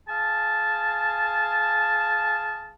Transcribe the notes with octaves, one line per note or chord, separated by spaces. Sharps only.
G#4 F5 G#5 A5